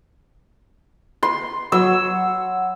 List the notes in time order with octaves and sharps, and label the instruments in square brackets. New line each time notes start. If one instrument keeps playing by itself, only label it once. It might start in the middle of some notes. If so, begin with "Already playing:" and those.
[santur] C6
[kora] F#3 [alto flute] F#5 [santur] E6